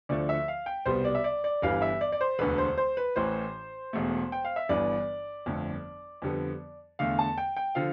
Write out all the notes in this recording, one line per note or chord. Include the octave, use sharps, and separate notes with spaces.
D2 D3 F3 A3 D5
E5
F5
G5
C2 B2 G3 B3 C5
D5
E5
D5
D5
G1 G2 E3 G3 F5
E5
D5
D5
C5
E1 D2 D3 B4
C5
C5
B4
A1 A2 E3 C5
E1 E2 B2 A3
G5
F5
E5
G1 G2 E3 B3 D5
G1 F2 D3 A3
F2 D3 G3 B3
E2 D3 A3 F5
A5
G5
G5
D3 F3 F5